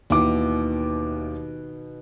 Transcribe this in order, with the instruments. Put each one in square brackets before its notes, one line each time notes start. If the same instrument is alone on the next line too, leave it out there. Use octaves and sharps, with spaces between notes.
[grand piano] D#2 E3 D6 [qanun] B2 D#3